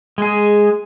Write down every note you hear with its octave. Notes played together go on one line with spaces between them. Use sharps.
G#3 G#4